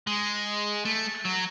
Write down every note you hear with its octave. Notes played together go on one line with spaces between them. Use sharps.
G#3
A3
F#3